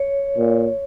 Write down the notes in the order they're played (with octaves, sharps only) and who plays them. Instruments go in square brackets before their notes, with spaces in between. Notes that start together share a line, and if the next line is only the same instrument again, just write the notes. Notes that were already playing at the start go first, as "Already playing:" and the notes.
Already playing: [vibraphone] C#5
[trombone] A#2